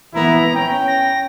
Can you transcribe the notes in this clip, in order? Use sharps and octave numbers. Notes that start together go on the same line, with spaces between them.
E3 B3 E4 A#5
C#4 G5
A#6